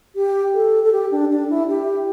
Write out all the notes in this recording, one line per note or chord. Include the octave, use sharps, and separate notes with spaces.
G4
A4
A4
G4
D4
D4
E4
G4